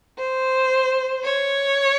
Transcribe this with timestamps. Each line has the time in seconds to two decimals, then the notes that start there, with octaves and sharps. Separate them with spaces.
0.18 C5
1.24 C#5